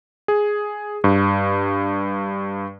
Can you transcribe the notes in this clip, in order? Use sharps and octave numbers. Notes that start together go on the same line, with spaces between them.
G#4
G2